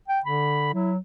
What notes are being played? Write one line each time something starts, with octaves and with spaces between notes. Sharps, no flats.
G5
D3 B5
F#3 E4